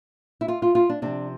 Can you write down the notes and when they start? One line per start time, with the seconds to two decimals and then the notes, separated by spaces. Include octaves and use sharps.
0.41 E4
0.48 F4
0.62 F4
0.75 F4
0.89 D4
1.02 C3 F3 D4